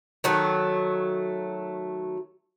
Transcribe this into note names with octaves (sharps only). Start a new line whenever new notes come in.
D#3 F#3 A3